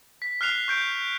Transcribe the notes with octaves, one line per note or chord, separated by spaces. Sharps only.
B6
F6 F#6 C7 F7
C#6 G6 D7